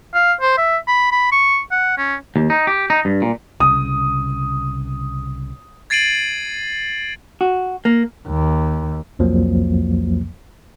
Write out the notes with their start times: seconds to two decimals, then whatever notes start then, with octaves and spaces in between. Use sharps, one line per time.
0.14 F5
0.41 C5
0.58 E5
0.88 B5
1.12 B5
1.32 C#6
1.71 F#5
1.98 C#4
2.36 D#2
2.50 D#4
2.67 G4
2.90 D#4
3.05 G2
3.22 A#2
3.60 C2 C#3 D#6
5.90 G#6 A6 C7 D7 D#7 F#7
7.41 F#4
7.85 A#3
8.28 D#2
9.19 C2 F2 F3 F#3 A#3